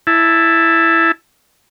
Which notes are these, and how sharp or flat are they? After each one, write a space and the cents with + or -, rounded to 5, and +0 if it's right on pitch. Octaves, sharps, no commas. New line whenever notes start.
E4 +0 A5 +0